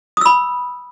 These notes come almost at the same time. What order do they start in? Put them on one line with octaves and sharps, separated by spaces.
D#6 E6 B5